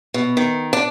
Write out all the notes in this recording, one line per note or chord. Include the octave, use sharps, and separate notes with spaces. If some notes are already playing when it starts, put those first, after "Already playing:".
B2
D#3
D4